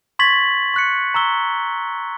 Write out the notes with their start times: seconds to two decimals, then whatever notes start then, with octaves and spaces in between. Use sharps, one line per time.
0.19 C6 C#6 G#6 A6 B6 F#7
0.74 C#6 F#6 C#7
1.14 A#5 C#6 E6 G7